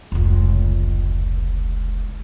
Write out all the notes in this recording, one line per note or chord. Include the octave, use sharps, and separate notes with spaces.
F1 C#2